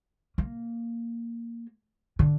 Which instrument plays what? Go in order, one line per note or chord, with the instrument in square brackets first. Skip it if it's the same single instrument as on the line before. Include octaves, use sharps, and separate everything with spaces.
[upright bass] A#3
D3